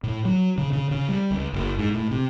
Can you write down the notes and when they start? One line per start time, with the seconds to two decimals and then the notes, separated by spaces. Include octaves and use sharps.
0.03 A2
0.25 F#3
0.58 C#3
0.73 C#3
0.91 C#3
1.09 G3
1.30 C#2
1.53 F#1
1.79 G#2
1.94 A2
2.11 C3